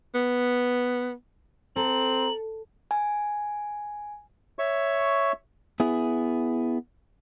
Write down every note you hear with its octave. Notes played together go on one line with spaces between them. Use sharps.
B3
C4 A4 A#5 F#7
G#5
C#5 E5 C#6
B3 E4 G#4